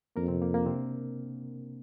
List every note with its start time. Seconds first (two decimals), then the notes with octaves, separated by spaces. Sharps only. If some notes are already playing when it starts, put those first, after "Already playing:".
0.16 F2 A#3 A#4
0.28 C3 C4
0.41 A#3
0.54 A#3
0.62 D4
0.66 C3 C4